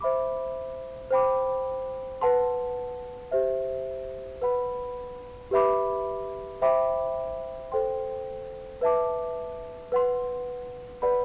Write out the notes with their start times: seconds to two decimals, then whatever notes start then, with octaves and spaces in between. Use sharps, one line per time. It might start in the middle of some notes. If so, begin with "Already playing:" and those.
0.01 C5 E5 B5 D6
1.11 C5 G5 B5 D6
2.21 B4 F#5 A5 C6
3.31 G4 C5 E5
4.42 B4 F#5 B5
5.51 G4 B4 E5 B5 D6
6.62 C5 E5 G5 B5 D6
7.72 A4 C5 G5 C6
8.81 B4 E5 A5 D6
9.92 B4 F#5 C6
11.02 B4 D5 F#5 B5